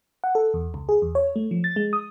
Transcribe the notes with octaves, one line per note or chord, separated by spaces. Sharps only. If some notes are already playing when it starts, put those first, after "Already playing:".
F#5
A4
E2
C#2
G#4
E2
C#5
A3
F3
A6
G#3
D#6